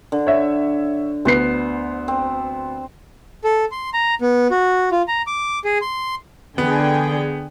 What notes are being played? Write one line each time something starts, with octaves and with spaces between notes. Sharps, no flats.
D3
C#5 E5
D2 B3 C5 C7
C4
A4
C6
A#5
B3
F#4
F4
A#5
D6
G#4
C6
D3 B3 G#4 G5